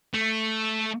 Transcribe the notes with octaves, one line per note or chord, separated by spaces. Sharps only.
A3